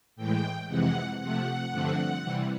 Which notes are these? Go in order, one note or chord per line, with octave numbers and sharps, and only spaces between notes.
A2 E3 G#3 G5
F2 C3 E3 G#3 F#5
C3 F3 A3 F#5
G2 D3 F3 A3 C4
C3 E3 G3